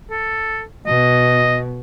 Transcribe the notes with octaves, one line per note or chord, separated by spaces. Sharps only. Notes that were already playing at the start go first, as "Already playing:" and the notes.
A4
B2 D#5